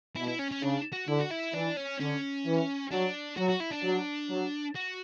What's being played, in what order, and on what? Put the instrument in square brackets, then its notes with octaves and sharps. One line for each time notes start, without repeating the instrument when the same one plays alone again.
[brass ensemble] B2 [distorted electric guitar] E4
[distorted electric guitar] E4
C#4
C#4
[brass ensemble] C#3 [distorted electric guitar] D4
[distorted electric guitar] F#4
[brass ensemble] D3 [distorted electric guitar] E4
[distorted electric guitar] F#4
E4
[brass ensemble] E3 [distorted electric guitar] D4
[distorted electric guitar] C#4
[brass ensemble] D3 [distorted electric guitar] C#4
[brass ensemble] E3
[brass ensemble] F#3 [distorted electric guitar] D4
[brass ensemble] F#3 [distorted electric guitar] F#4
[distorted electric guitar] F#4
E4
D4
[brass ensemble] F#3
F#3
[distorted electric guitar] F#4